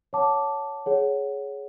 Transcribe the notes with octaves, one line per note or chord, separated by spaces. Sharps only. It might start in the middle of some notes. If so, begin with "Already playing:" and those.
C#5 F#5 A5 D6
G#4 C#5 F#5